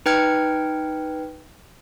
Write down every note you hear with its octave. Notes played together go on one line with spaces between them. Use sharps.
D#4 B4 G5 F6 G#6 C#7